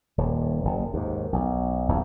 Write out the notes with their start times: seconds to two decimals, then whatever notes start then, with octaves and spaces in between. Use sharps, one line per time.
0.18 D#1 D#2
0.65 F#1
0.94 D#2 G#2
1.33 B1
1.89 D#1 B1 E2